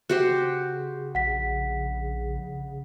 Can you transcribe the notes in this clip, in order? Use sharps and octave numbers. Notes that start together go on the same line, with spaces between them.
C#3 F#4 G4 C5
A#1 F#5 B6